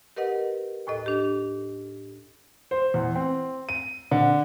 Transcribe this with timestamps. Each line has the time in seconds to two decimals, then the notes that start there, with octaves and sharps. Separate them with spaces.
0.16 G4 A#4 B4 D#5 F#5
0.87 D#2 A2 A4 D#5
1.06 D4 G4
2.71 C5
2.94 E2
3.15 C4
3.69 D#7
4.11 D3